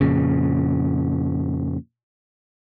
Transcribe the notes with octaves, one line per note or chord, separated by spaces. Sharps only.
F2 A#2 C#3